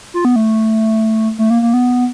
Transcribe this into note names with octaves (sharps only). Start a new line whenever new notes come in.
F4
B3
A3
A3
A#3
A#3
B3